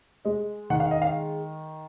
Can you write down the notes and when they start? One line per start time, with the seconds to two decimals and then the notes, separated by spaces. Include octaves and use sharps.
0.25 G#3 D#5
0.70 D#3 F#5
0.80 F5
0.91 D#5
1.02 F5